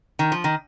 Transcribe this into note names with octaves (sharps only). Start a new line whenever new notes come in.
D#3
F3
D#3